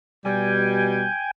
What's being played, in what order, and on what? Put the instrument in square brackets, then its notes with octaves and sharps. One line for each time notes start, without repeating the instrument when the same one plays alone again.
[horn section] B2 G3 [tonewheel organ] G5 G#5